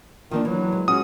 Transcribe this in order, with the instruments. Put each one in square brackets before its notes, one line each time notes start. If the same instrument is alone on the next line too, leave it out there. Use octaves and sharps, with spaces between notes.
[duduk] D#3 [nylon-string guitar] F3 A#3 D4
[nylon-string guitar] E3 [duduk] F#3
[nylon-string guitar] G#3
[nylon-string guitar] G#3 F#4 [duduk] C#4 [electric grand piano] D#6